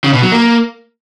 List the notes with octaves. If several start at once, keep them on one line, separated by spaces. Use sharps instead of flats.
C#3
B2
F#3
A#3